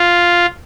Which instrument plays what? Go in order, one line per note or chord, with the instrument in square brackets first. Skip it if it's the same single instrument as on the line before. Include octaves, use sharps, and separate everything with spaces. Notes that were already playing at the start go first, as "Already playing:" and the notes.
Already playing: [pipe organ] F4